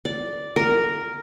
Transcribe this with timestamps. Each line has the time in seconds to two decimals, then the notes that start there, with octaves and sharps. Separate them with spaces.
0.05 D5
0.56 A#4